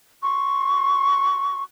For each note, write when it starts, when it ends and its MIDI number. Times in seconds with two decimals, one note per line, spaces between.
0.23 1.63 84
0.23 1.63 85